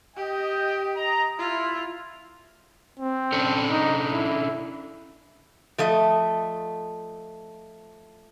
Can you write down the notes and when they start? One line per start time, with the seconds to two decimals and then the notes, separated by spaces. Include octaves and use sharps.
0.17 G4 D#5 G5
0.96 D#5 A#5
1.39 E4 F4
2.99 C4
3.32 C#4 D4 A4
3.70 D#4
4.12 E4
5.78 F3 A3 D#5